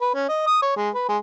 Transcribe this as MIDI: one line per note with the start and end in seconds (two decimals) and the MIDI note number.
0.01 0.11 71
0.14 0.26 61
0.29 0.45 75
0.47 0.59 87
0.62 0.71 73
0.77 0.90 56
0.95 1.05 71
1.09 1.17 56